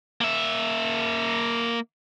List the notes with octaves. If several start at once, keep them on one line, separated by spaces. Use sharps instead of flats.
A#3 E5